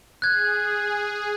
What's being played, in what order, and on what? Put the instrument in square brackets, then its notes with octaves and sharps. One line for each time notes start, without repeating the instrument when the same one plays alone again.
[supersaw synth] G#4 [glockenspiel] F#6 G#6